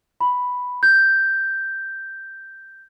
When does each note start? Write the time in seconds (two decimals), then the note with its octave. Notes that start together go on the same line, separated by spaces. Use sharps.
0.21 B5
0.83 G6